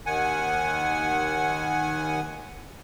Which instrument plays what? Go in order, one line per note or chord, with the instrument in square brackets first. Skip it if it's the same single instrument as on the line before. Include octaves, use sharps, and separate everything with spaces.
[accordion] D#2 D#3 F#5 G#5